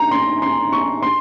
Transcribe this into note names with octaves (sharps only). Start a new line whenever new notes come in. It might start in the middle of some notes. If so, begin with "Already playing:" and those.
Already playing: A#5
C6
C6
C#6
C6